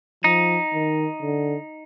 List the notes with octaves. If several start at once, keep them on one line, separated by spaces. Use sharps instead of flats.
F3 D#4
D#3
D3